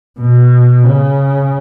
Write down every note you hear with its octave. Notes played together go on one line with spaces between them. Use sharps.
B2
C#3